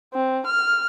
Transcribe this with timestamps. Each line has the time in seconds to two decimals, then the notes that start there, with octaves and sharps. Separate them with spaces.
0.14 C4
0.47 F6